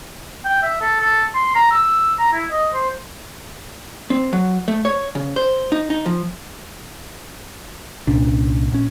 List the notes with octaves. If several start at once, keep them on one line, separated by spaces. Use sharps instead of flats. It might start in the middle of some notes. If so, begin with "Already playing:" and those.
G5
E5
A4
A4
C6
A#5
E6
A#5
E4
D#5
C5
C4
F#3
A3
C#5
C#3
C5
D#4
D#4
F3
C2 A#2 C#4 D4
A#1 C#4